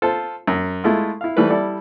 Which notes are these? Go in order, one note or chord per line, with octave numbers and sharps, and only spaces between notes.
F4 A4 C5
F#2
G#3 A3 E4 F4
E4 F5
E3 G3 A3 B4 C5
G3 E4 A4 D5